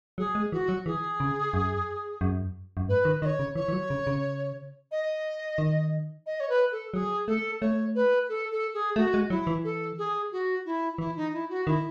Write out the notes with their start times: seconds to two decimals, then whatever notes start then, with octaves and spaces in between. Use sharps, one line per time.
0.18 F#3 G#4
0.35 G#3
0.52 E3 F#4
0.69 F#3
0.86 E3 G#4
1.20 C#3
1.54 F#2
2.21 F#2
2.77 F#2
2.89 G#2 B4
3.05 D#3
3.22 D#3 D#5
3.25 C#5
3.39 C#3
3.55 E3 C#5
3.68 E3
3.73 F#3
3.90 C#3
4.07 C#3
4.91 D#5
5.58 D#3
6.26 D#5
6.40 C#5
6.49 B4
6.72 A4
6.93 F#3 G#4
7.27 A3 A4
7.61 A3 C#5
7.95 B4
8.29 A4
8.51 A4
8.74 G#4
8.96 A3 F#4
9.14 G#3
9.30 F#3 E4
9.47 E3
9.64 A4
9.98 G#4
10.32 F#4
10.65 E4
10.98 E3 E4
11.16 D#4
11.33 E4
11.50 F#4
11.67 D#3 E4